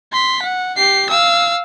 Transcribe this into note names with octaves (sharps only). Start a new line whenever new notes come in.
C6 B6
F#5
G4 C7
F5 E6